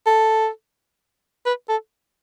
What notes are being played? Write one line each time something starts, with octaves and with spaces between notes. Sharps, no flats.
A4
B4
A4